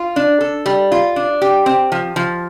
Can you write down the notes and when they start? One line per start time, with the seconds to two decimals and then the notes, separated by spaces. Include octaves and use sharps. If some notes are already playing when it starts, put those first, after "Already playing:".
Already playing: F4
0.16 D4
0.41 A4
0.66 G3
0.92 F4
1.16 D4
1.42 G4
1.66 C4
1.92 F3
2.16 F3